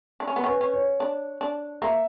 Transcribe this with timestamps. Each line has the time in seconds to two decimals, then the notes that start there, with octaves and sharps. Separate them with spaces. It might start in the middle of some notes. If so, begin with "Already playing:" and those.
0.20 D4
0.27 C#4
0.36 B3
0.44 C#4 B4
0.61 C#4
0.74 C#5
1.00 D4
1.41 D4
1.82 A#3 E5